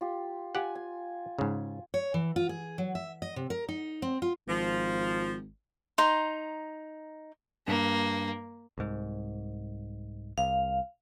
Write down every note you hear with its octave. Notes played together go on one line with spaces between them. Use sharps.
F4 G4
F4 G4 F#5 G#5
G#5
G#2 C#3
C#5
E3
F4
G#4
F#3
E5
D#5
C3
A#4
D#4
C4
F4
G#1 F3
D#4 A#5 C6
G2 A#3
C2 G#2
C2 F5